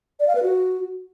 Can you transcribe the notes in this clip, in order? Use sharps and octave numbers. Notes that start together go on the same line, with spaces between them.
D5
F5
B4
F#4